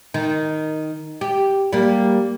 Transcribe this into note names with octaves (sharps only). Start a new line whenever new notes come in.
D#3
G4
G3 A#3